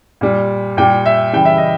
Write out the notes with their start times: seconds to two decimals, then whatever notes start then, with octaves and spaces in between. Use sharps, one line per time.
0.21 A#2 G3
0.77 A#2 G3 G5
1.06 E5
1.33 C#3 E3 G3 G5
1.45 E5
1.58 D#5